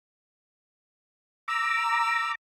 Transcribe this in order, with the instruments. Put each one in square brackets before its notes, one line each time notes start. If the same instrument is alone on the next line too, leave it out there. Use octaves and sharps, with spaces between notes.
[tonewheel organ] A#5 D6 [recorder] E6